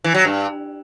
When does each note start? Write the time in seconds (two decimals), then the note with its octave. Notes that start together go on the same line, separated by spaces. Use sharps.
0.04 E3
0.15 F#3
0.25 G2